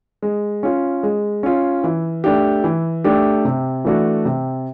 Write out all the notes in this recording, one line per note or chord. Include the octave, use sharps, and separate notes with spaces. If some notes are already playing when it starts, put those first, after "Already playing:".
G#3
C#4 F4
G#3
C#4 F4
E3
A3 D4 G4
E3
A3 D4 G4
C3
E3 A3 D4 F#4
C3